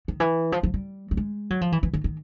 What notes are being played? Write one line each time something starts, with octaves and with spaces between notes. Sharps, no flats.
D#3
E3
F3
F3
G3
G3
G#3
F#3
F3
E3
E3
D#3
D#3